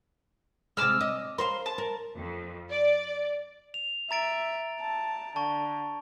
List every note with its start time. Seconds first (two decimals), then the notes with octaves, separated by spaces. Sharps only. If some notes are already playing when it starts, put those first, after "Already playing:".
0.77 C3 G#3 D6 E6 F6
1.01 D#5
1.38 A#4 C5 F5 C6
1.66 A5
1.78 A#4
2.16 F2
2.70 D5
3.74 F7
4.11 E5 A#5 A6 D7
4.80 A5
5.36 D3 A5 C#6